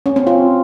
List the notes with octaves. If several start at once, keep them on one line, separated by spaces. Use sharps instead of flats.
C#4
C4
F4